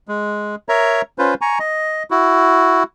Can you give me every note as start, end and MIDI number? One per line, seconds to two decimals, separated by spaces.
0.08 0.55 56
0.69 1.02 70
0.69 1.02 73
0.69 1.02 76
0.69 1.02 82
1.18 1.34 61
1.18 1.34 65
1.18 1.34 71
1.18 1.34 72
1.41 1.59 80
1.41 1.59 82
1.41 1.59 85
1.59 2.03 75
2.11 2.83 64
2.11 2.83 66